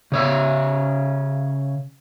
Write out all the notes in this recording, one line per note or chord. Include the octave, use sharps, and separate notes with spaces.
C#3 C#5 E5